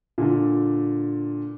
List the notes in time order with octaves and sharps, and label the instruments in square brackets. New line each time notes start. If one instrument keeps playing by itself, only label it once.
[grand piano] A#2 D3